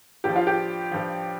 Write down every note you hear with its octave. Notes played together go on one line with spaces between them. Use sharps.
G2 F3 G4
F4
G4
G2 F3